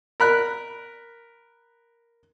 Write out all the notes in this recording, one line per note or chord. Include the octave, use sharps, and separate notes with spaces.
A#4 B5 F#6